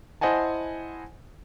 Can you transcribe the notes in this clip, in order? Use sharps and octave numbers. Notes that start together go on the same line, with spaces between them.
E4 C5 D#5 F#5 G#5 A5